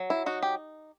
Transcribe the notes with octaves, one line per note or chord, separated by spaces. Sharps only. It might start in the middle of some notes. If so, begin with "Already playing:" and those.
Already playing: F#3
E4
D#4 F#4
G4